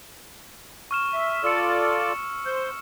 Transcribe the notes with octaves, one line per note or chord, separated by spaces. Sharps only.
C#6 F6 E7
E5
F4 A4 D5 E6 C#7
C5 G6